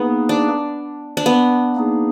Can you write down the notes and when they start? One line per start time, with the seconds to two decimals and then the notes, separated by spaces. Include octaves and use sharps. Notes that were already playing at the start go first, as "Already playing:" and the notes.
Already playing: A#3 B3 D#4 G#4 B4
0.29 D4
1.17 D4
1.26 B3
1.76 A#3 D#4 G#4